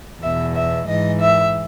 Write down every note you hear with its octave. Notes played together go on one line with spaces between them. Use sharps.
E2 B2 E5
E5
G#2 E3 D#5
E5